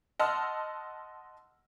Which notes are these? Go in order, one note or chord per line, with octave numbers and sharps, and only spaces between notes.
D#5 F#5 A5 C6 E6 F6